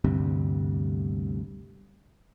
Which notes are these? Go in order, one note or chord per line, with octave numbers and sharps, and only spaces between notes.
G1 D2 G2 C3